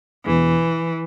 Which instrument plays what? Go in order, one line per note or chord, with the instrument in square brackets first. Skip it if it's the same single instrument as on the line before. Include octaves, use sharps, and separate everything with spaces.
[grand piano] E1 E2 B2 [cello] E3